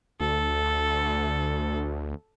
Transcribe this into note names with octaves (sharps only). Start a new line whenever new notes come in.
D2 A4